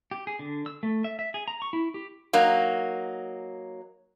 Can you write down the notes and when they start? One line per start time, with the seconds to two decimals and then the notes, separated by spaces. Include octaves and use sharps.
0.11 G4
0.27 G#4
0.39 D3
0.66 E6
0.83 A3
1.04 E5
1.19 E5
1.34 G#4
1.48 A#5
1.62 C#6
1.73 E4
1.94 G4
2.33 F#3 A#3 D#4